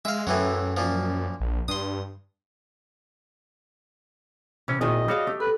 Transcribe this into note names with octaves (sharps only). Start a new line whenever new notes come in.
G#3 E5 F5
F#2 A2 E3 F#3
A#2 F3
A#1
G2 C6 D#6
C3 E3 C#4
G#1 A#2 D#3 E4 D#5 G#5
G3 F#4 G#4 C#5 F5
A3 G4
A4 B4